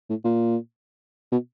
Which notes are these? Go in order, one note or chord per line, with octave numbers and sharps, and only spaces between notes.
A2
A#2
B2